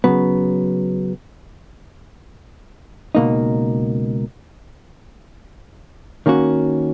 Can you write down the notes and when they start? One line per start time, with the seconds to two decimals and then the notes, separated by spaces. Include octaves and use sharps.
0.04 C#3 F#3 B3
3.15 C#2 B2 A#3 D#4
6.26 D#3 A#3 C#4 F#4